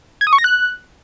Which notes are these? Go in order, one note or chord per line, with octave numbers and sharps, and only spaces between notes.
G#6
D#6
C#6
A#6
F#6